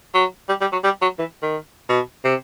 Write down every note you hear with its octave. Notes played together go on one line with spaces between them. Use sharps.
F#3
G3
G3
F#3
G3
F#3
E3
D#3
B2
C3